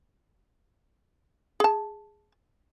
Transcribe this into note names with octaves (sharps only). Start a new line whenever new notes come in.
G#4 A5